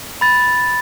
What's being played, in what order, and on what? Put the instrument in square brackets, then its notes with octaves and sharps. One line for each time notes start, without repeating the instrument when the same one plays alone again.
[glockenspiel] B5 A6